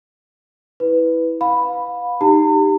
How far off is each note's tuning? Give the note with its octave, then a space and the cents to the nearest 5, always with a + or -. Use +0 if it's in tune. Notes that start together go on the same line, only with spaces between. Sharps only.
E4 -15 B4 +5
F5 +35 B5 +0
D#4 +0 G4 +0 A#5 -45